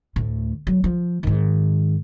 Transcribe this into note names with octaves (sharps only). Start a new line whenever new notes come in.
D2 A2
F#3
F3
G#2 D#3